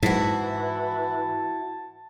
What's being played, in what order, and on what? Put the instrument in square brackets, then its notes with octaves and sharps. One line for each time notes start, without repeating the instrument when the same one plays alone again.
[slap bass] G#2 [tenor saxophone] E3 [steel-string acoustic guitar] E4 F#4 [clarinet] A5